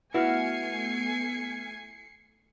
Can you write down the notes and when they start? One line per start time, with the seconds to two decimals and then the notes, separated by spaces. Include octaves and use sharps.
0.14 A3 B3 E4 F#4 G#5 F6 C7 C#7